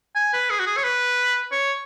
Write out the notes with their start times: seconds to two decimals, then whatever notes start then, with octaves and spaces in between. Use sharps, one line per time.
0.16 G#5
0.34 B4
0.50 G#4
0.60 F#4
0.67 G#4
0.77 C#5
0.84 B4
1.52 C#5